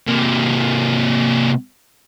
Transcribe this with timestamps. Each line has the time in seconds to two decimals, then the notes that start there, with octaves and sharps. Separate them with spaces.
0.07 C3 A#3